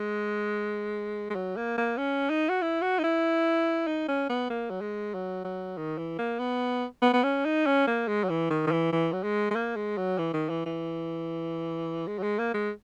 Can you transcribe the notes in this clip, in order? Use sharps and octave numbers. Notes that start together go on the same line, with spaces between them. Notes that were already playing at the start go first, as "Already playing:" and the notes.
Already playing: G#3
G#3
F#3
A#3
A#3
C#4
D#4
F#4
E4
F#4
D#4
E4
D#4
C#4
B3
A#3
F#3
G#3
F#3
F#3
D#3
E3
A#3
B3
B3
B3
C#4
D#4
C#4
A#3
G#3
F#3
E3
D#3
D#3
E3
E3
F#3
G#3
G#3
A#3
G#3
F#3
E3
D#3
E3
E3
G#3
F#3
G#3
A#3
G#3